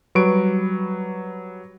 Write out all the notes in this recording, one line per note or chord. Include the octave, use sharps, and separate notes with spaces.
F#3 G3 B4 C#6 D7